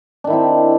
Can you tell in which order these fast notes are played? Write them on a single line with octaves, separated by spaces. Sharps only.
D4 D#3 E4 C4